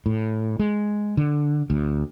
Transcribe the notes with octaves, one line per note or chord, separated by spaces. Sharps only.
A2
G#3
D3
D2